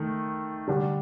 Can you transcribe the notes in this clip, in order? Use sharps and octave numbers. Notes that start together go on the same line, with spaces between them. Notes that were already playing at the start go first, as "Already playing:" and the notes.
Already playing: D#3 A3
D3 G3 D4